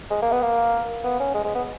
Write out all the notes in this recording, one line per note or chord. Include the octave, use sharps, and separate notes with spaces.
G#3
A#3
B3
A#3
B3
C#4
G#3
G#3
B3